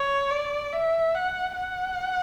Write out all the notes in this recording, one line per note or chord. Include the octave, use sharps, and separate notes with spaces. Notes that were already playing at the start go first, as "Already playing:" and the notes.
Already playing: C#5
D5
E5
F#5
F#5